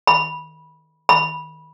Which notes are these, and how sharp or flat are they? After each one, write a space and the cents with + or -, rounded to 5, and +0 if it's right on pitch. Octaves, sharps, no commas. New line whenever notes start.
B5 -15
B5 -15